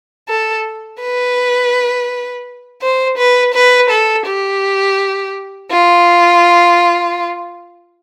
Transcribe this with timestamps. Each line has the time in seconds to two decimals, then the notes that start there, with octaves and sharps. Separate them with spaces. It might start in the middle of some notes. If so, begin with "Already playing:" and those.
0.29 A4
1.01 B4
2.82 C5
3.18 B4
3.54 B4
3.90 A4
4.27 G4
5.71 F4